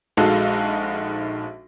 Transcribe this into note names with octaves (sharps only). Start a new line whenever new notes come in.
A#1 G#3 D#4 F#4 A4 F5